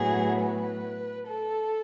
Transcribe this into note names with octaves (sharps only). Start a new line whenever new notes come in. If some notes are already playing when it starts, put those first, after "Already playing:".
Already playing: A2 F#3 B3 G#4
B4
A4